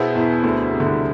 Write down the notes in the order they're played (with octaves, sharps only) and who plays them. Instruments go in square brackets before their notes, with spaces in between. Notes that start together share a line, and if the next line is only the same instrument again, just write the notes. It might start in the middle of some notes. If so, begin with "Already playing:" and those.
Already playing: [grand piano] B2 B3 E4 G#4 C5
[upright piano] E2 E3
D2 D3
C3
D3
C2 C3